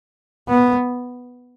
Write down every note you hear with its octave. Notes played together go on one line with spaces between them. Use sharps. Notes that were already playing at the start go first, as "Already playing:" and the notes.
B3